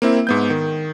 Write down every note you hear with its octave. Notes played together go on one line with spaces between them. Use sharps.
A#3 C4 E4
G#2 B3 G6
D#3